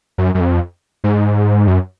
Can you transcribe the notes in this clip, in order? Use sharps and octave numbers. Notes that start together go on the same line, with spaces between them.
F#2
F#2
F2
G#2
F#2